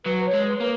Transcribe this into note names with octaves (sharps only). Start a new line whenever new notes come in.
F#3 B4
C#5
G#3
B4
A#3